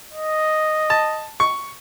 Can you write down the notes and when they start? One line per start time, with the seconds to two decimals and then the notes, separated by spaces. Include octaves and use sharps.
0.13 D#5
0.90 A5
1.40 C#6